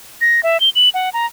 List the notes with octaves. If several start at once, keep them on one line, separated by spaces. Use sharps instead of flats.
A#6
E5
G7
F#7
F#5
A#5